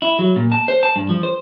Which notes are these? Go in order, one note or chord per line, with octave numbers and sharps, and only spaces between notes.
E4
F#3
A#2
A5
C5
A5
G2
F3
C5